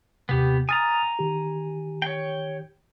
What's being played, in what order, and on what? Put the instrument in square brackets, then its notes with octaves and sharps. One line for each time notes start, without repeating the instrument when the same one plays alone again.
[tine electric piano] D#2 C3 [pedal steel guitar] B3 G4
[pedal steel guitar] G#5 A#5 [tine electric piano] D#6 F6 A6
[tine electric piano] D#3 G4
[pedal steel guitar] C#5 G5